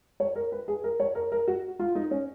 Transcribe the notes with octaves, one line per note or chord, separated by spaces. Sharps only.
C#5
A#4
B4
G#4
A#4
C#5
A#4
A#4
F#4
F4
D#4
C#4